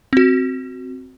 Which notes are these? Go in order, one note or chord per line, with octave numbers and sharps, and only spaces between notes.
C4 F#4